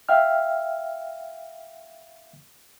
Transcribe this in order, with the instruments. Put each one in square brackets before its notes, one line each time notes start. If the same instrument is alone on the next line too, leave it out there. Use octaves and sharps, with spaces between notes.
[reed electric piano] E5 F5 G5 F6